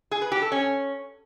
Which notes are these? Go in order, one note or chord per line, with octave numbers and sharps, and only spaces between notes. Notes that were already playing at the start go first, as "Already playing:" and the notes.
G#4
B4
G4
A4
C#4